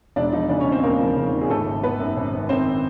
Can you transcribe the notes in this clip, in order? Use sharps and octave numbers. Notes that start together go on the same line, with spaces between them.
E1 D4 D5
F3 D#4 D#5
C#3 D4 D5
C#4 C#5
D#2
C4 C5
E1 A#3 A#4
F3
C#3
D#2
G#4
G#1 A3 A4
G#1
D#3 B3 B4
F#2
G#1
G#1
D#3 C4 C5